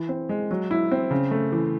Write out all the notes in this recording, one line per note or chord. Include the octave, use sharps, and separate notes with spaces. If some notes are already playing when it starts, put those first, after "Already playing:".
Already playing: E3
C4
G#3
F#3
E4
C4
C#3
A3
E3